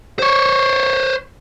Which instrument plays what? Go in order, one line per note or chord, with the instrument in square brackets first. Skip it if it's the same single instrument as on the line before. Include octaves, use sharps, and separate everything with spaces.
[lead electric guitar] C5 C#5